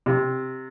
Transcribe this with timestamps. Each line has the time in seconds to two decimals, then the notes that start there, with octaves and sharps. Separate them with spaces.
0.06 C3